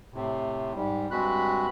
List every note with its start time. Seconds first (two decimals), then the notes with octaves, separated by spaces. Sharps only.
0.14 A2 C3
0.75 G#2 G3
1.11 G2 G#3 C4 F#4 B5 F#6